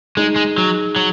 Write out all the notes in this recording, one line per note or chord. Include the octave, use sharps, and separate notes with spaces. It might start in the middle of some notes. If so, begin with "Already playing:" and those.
G#3 D#4 G#4
G#3
F#3
F#3